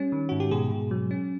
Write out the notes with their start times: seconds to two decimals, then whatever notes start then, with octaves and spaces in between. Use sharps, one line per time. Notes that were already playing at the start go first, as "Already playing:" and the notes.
Already playing: G3 C#4
0.12 D#3
0.29 G#2 F#4
0.40 G4
0.51 B2 G#4
0.71 B2
0.91 F#3
1.11 C#4